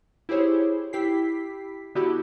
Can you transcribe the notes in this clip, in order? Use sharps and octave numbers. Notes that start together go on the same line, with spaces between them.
E4 G4 G#4 C5 C#5
E4 G4 G5 B6 C7
D3 B3 E4 F#4 G4